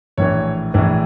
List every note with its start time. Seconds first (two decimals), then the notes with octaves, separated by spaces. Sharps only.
0.18 A#1 A2 E3 C#5
0.74 A#1 A2 E3